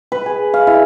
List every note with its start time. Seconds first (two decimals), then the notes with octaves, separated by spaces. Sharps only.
0.12 B4
0.26 G#4
0.54 F5
0.67 E4